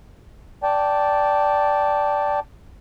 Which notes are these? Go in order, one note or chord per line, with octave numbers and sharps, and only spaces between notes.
D5 G5 A5